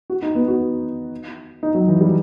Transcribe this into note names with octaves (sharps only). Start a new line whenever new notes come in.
F#4
D#4
B3
F#4
D#4
F#3
E3
G3